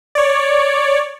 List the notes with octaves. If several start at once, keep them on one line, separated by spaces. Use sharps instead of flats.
C#5 D5